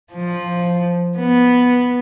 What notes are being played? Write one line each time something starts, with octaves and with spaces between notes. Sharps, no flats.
F3
B3